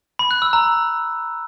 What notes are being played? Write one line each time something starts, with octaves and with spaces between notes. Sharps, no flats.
B5
F#6
E6
A#5